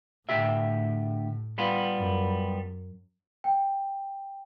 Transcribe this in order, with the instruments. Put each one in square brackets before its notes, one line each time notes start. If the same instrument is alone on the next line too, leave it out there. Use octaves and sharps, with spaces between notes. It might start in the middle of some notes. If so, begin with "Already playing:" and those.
[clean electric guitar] D2 G4 E5 [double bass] A2
[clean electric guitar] G3 B3 F4
[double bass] F#2
[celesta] G5